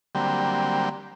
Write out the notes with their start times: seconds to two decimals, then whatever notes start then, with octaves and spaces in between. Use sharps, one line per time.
0.15 D3 F#3 G3 A#3 C4 G4